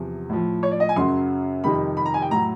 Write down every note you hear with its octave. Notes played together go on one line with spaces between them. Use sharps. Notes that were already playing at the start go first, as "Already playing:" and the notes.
Already playing: E2 C3 F3
A2 F3
C#5
D5
D#5
G#5
F#2 C#3 F#3 C6
F2 C3 D#3 G3 B5
B5
A#5
G#5
G5
A2 F#3 A#5